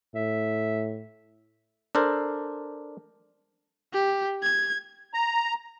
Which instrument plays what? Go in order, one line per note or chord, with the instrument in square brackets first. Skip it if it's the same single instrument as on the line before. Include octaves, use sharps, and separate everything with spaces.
[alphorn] A2 [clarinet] E5
[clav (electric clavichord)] D4 A4 A#4 C5
[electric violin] G4
G#6
[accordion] A#5